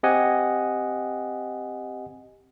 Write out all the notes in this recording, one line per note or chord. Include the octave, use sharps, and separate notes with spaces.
C4 G4 D#5 F#5 G#5